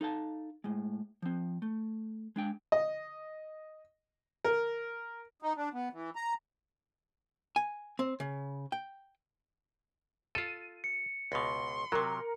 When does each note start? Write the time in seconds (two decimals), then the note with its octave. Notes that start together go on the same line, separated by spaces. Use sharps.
0.01 D#4 A4 F5 A5
0.64 A2 G#3
1.22 F3 C4
1.62 A3
2.36 G#3 D4 G5
2.72 D#5
4.45 A#4
5.42 D#4
5.56 D4
5.73 B3
5.92 E3
6.16 A#5
7.56 G#5
7.99 C4
8.20 C#3
8.72 G5
10.35 F4 A4 D#7
10.84 C#7
11.32 C#2 B2 C6
11.92 C3 F#3 A#4